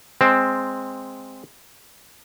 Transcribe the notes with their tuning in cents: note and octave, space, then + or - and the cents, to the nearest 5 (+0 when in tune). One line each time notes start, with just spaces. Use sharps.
G#3 +0 C4 +0